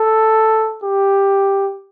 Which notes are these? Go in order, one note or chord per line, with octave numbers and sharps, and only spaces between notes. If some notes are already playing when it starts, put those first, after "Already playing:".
Already playing: A4
G4